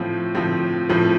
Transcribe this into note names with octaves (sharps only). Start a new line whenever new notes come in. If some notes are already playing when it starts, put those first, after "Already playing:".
Already playing: A2 F3 C4
A2 F3 C4
A2 F3 C4